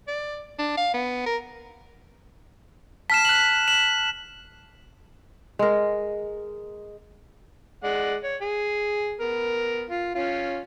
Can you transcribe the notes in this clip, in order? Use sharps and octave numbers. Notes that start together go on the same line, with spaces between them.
D5
D4
F5
B3
A#4
A5 F6 B6 C7 E7
F#6 F#7
E7 F#7
G#3 A#4
G#3 D5 F#5
C#5
G#4
B3 A#4
F4
C#4 F4